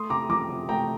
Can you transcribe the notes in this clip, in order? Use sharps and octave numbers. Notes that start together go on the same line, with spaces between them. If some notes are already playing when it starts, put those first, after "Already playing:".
Already playing: A3 C6 D#6
C3 A#5 D6
F3 A#5 D6
C3
A3 G5 A#5